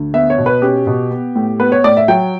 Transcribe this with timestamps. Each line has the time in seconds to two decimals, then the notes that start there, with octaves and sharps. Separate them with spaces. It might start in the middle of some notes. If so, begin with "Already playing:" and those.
Already playing: D2
0.14 B3 E5
0.30 C#5
0.38 B2
0.46 B4
0.62 C#4 G4
0.87 B2
1.11 B3
1.35 A2
1.60 B3 B4
1.72 C#5
1.84 A2 D5
1.97 E5
2.08 F#3 G5